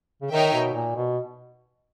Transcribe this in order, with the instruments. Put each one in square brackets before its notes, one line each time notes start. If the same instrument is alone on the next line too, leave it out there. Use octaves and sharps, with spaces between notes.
[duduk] C#3
[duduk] D#3 [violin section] D#4 A#4 C#5 E5 G5
[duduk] B2
A#2
B2